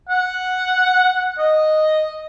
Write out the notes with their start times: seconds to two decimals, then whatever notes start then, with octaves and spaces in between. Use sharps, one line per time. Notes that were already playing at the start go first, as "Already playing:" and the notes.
0.09 F#5
1.38 D#5